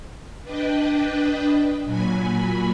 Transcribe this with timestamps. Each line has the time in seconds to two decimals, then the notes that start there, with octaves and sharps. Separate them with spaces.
0.43 D4 B4 D#5 G5
1.85 A#2 F#3 G#5 B5